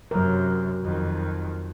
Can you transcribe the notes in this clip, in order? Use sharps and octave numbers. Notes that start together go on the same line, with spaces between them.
F#2 C3 F#3 A#4
F2 D#3